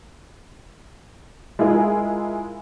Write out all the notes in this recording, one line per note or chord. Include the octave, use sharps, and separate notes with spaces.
G#3 E4 F4 G#4 A#4